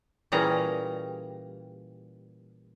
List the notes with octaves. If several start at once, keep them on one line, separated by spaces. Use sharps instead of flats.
A#2 E3 G3 C#4 G#4 A#5